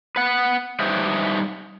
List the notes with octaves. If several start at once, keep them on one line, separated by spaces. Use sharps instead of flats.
B4 F#5
G3 D#4 B4 C5 D#5 E5